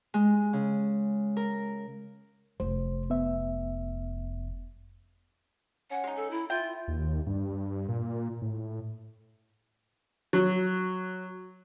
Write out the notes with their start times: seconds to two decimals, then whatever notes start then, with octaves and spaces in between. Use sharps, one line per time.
0.14 G#3
0.53 C#3
1.37 A#4
2.60 F1 C5
3.10 B3 E5
5.91 C#4 F#5
6.04 G#3 D#4
6.16 A4
6.31 E4
6.50 E4 F4 G5
6.88 D#2
7.27 G2
7.88 A#2
8.42 A2
10.33 F#3